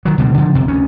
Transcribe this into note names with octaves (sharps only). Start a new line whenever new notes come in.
D#3 F#3
C#2 B2 D3 G3
D3 F3
E1 C3
D2 C#4